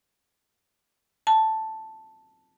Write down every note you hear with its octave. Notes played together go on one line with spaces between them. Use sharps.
A5